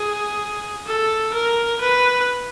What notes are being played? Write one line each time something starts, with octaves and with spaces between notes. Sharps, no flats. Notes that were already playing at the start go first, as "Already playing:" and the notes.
Already playing: G#4
A4
A#4
B4